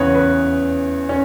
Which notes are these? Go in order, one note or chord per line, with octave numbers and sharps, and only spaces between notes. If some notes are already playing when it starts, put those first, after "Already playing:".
Already playing: E2 C#3 E3 B4 C#5
B4
C#4